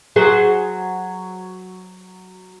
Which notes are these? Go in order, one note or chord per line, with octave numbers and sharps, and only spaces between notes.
F#3 G#4 C5